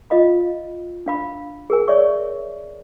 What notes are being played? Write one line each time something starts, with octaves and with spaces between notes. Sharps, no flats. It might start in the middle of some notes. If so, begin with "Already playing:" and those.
F4 D#5 F5 B5
D4 F5 B5
G#4 A#4 G#5
C#5 D5 E5 C#6